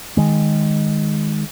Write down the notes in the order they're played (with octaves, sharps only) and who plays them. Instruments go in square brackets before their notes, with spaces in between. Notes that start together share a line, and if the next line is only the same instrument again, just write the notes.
[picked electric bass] D#3 G#3